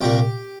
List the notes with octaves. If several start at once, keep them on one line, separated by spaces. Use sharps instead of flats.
C2 A#2 A#3 G4